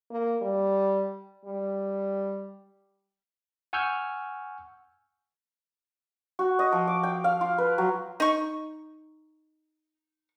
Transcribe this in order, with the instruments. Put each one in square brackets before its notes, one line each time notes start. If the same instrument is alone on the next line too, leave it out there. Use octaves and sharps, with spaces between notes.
[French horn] A#3
G3
G3
[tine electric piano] F#5 G#5 C#6 E6 F6 G6
[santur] F#4
D#5
F3
D6
G5
F5
F4
B4
F#3
[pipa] D#4 C#6